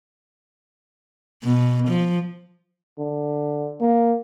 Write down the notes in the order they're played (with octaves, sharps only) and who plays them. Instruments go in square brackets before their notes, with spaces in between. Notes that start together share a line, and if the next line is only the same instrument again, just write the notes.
[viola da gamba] B2
F3
[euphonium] D3
A#3